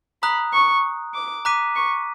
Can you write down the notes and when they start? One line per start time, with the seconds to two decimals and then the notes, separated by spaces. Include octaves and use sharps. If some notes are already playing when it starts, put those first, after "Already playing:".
0.22 A#5 B5 D#6 F#6
0.53 C#6
1.14 D6
1.45 A#5 D6 F#6 B6 D#7
1.75 C#6